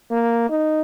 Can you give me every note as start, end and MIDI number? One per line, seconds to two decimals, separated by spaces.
0.11 0.45 58
0.49 0.82 63